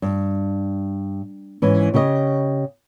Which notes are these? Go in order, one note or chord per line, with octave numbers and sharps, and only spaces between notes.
G2
G#2 E3 C#4
C#3 G4 C#5 D#5